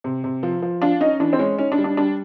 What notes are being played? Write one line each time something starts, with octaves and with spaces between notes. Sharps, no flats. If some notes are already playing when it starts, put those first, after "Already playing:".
C3
C3
F3
F3
D4 F4
C#4 D#4
E3 D4
C4
G#3 C#4
C#4 D#4
D4
G3
D4
G3 D4